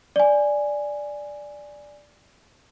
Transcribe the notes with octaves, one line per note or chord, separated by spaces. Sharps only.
D5 G#5